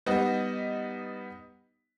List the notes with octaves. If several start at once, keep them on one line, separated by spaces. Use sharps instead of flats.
G3 B3 D#4 D#5